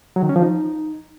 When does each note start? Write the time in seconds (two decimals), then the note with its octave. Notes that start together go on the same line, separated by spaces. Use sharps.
0.16 F#3
0.23 D#3
0.29 C#4
0.36 F3
0.42 D#4